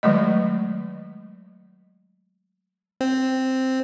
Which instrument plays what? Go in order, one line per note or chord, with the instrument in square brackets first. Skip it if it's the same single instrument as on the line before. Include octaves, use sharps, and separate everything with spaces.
[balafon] D#3 F#3 G#3 A3 D#5
[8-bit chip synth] C4